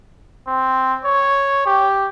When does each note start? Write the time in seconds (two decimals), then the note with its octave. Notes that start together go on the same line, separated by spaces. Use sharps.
0.47 C4
1.05 C#5
1.66 G4